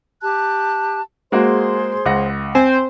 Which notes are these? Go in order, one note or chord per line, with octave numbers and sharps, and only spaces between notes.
G4 A5 F#6
G#3 A#3 F#4 G#4 C5 C6
C#2 F#5 A#6
C4 C5 G#5